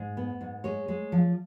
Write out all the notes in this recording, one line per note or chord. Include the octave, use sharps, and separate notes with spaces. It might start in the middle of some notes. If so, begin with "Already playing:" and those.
Already playing: G#2
B3
G#2
G#3 C#5
G#3
F3